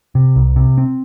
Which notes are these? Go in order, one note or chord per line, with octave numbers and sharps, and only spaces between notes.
C3
C2
C3
C4